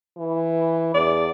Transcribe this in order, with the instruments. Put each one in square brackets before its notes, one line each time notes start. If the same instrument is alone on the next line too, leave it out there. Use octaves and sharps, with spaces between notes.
[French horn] E3
[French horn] E2 [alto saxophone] D5